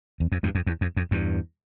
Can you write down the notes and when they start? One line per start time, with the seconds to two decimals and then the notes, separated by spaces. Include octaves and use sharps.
0.20 E2
0.32 F2
0.43 E2 G2
0.55 F2
0.66 E2
0.81 F2
0.97 F2
1.11 E2 G2